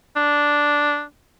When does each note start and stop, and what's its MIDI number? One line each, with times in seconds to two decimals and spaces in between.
0.16 1.03 62